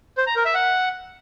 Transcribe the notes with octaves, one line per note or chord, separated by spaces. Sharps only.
C5
A#5
A#4
E5
F#5